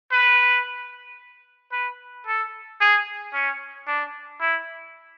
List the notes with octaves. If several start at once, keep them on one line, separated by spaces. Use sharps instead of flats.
B4
B4
A4
G#4
C#4
D4
E4